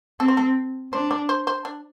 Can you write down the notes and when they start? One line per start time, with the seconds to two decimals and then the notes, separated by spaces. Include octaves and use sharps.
0.20 C4 A4
0.28 C5
0.37 A4
0.92 D4 C5
1.11 D5
1.29 C5
1.47 C5
1.65 D4